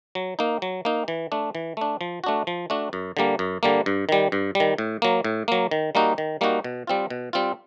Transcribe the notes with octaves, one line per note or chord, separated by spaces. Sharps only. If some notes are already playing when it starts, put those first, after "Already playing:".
F#3
A#3 D#4
F#3
A#3 D#4
E3
A3 D4
E3
A3 D4
F3
A3 D4 F#4
F3
A3 D4 F#4
F#2
D3 G3 A#3
F#2
D3 G3 A#3
G2
D#3 G3
G2
G3
D#3
A2
F#3 A#3
A2
F#3 A#3
D#3
G3 A#3 D#4 F#4
D#3
G3 A#3 D#4 F#4
B2
G3 C4 F4
B2
G3 C4 F4